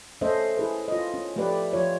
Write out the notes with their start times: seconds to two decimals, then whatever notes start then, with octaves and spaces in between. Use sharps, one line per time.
0.21 A3 C#4 A4 C5 D#5 E5
0.57 E4 G#4 B4
0.88 F4 D#5
1.14 C#4
1.36 F3 A3 G4 B4 D5
1.73 F3 F4 C#5